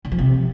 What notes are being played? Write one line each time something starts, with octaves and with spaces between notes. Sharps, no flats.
D3
F3
C3